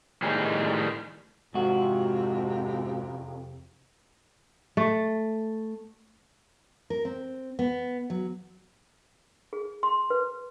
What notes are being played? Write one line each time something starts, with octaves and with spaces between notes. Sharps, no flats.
A2 D#3 G3 D#4 G#4
F2 G#2 C3 F#4
A3
A#4
C4
B3
F#3
G#4
C6
B4